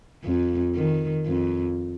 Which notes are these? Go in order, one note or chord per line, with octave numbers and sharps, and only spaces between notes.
F2
D#3
F2